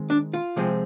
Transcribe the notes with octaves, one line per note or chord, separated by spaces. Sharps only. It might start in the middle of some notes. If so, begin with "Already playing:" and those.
Already playing: D#3 G#3 C4
D4
F4
C3 F3 G#3 C4